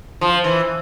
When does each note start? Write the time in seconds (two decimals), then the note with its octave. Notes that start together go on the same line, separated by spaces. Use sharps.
0.21 F3
0.44 E3